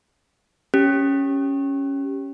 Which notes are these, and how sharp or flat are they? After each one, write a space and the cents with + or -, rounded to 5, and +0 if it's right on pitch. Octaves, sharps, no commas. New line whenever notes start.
C#4 +0 G4 +0